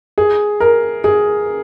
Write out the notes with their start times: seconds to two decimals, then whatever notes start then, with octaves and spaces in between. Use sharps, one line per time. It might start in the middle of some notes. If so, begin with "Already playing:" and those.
0.18 G#4
0.60 A#4
1.04 G#4